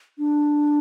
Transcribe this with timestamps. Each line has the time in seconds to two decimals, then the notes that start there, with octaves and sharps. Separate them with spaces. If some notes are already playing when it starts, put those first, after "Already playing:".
0.18 D4